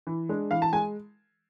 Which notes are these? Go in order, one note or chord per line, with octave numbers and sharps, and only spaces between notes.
E3
G#3 D4
E3 F5
A5
G#3 G#5